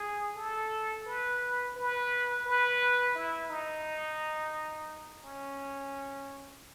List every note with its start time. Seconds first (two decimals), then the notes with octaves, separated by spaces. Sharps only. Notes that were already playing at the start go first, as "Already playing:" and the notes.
Already playing: G#4
0.37 A4
1.06 B4
1.76 B4
2.46 B4
3.16 E4
3.50 D#4
5.24 C#4